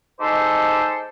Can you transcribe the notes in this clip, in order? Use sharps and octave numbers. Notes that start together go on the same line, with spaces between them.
G#3 D#4 G4 A4 C5